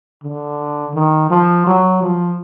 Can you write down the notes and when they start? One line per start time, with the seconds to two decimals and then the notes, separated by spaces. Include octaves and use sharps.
0.24 D3
0.95 D#3
1.31 F3
1.67 F#3
2.02 F3